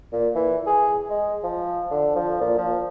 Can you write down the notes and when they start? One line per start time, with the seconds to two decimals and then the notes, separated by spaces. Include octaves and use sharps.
0.13 A#2
0.35 E3
0.67 G#4
1.10 G#3
1.44 F3
1.91 D3
2.15 F3
2.41 A#2
2.58 F3